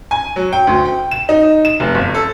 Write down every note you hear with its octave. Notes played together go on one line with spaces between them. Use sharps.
G#5
F#3
G5
D2
G5
E7
D#4
E7
F1
G1
A4